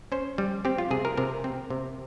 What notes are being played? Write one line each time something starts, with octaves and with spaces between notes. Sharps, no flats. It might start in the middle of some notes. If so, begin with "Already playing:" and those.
C#4 C5
G3
C4 G4
F4
C3 G#4
A#4
C3 A#4
C4
C3